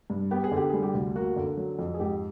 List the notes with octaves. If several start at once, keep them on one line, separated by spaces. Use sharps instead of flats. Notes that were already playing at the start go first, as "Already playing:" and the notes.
G2
B3 G4
G#4
D3 G4
G3 G#4
G4
D2
A#3 F#4
D3
F#3
F2
G#4
G#2 G4